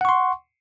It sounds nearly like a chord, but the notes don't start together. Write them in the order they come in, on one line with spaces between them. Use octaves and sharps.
F#5 C#6 C6